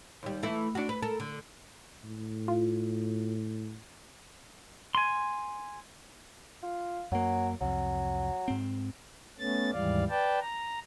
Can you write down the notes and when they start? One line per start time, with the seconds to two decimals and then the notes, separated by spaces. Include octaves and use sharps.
0.23 D#2 G3
0.43 E3 A3 E4
0.75 D4 F#4
0.89 B4
1.02 A4 A#4
1.20 D3
2.04 A2
2.48 F4
4.95 G#5 C6
6.63 F4
7.12 F#2 F#3 A#3
7.61 C2 F2 F#3
8.48 G#2 C4
9.40 A3 B3 C#4 A6
9.73 D#2 G#2 E3 G3 D5 F5
10.10 B4 D5 G5 A5
10.41 A#5